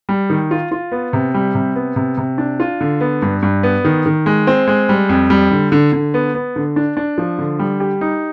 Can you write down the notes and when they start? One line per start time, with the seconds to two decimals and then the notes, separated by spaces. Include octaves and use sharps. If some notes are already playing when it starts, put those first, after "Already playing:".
0.09 G3
0.30 D#3
0.51 F4
0.71 F4
0.92 B3
1.13 C3
1.34 G3
1.55 C3
1.76 B3
1.96 C3
2.17 C3
2.38 D4
2.60 F4
2.81 D3
3.01 B3
3.22 G2
3.42 G2
3.63 B3
3.85 D#3
4.06 D#3
4.26 G#3
4.47 C4
4.68 G#3
4.89 G3
5.09 F2
5.30 G3
5.51 D3
5.72 D3
5.92 D3
6.14 B3
6.35 B3
6.56 D3
6.76 D4
6.97 D4
7.18 F3
7.39 D3
7.59 G3
7.80 G4
8.01 D#4